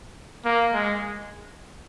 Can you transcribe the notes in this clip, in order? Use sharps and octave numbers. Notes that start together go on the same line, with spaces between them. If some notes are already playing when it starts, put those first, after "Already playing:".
A#3
G#3